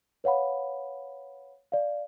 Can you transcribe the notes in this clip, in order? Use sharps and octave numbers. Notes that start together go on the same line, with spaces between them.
B4 C#5 F5 F#5 B5
D5 F5